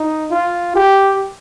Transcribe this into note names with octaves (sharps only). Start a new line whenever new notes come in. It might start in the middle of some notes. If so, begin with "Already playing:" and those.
Already playing: D#4
F4
G4